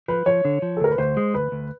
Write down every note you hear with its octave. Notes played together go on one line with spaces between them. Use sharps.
F3 B4
F3 C#5
D3
F3
A4
D2 A#4
B4
D2 C5
G#3
D2 B4
D2